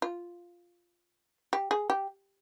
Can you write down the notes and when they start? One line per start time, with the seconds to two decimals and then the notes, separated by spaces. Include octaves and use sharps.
0.02 F4
1.53 G4
1.71 G#4
1.90 G4